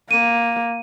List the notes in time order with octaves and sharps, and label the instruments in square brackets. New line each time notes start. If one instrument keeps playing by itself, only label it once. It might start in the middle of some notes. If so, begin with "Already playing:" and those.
[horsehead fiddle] A#3 [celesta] D#7